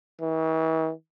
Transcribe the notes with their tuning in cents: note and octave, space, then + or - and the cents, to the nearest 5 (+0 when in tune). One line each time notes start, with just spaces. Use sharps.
E3 -45